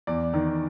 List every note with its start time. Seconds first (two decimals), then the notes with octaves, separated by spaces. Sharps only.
0.07 E2 D5
0.34 D#3